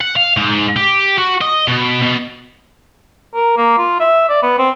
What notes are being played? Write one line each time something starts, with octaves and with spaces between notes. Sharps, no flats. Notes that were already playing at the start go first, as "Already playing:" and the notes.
F#5
F5
G#2
G4
F#4
D#5
B2
B2
A#4
A#3
F4
E5
D5
B3
C4